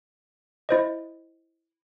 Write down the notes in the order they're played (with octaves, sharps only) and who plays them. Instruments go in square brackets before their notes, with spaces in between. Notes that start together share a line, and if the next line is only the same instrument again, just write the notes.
[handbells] E4 C5 D#5